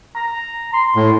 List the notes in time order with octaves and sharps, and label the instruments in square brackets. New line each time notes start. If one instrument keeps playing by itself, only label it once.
[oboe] A#5
C6
[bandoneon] A2